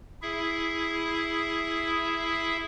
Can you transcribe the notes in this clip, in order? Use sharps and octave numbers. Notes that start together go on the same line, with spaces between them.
E4 G#4 E5